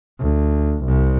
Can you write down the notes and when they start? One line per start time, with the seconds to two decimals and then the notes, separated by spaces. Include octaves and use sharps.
0.19 D2
0.84 C2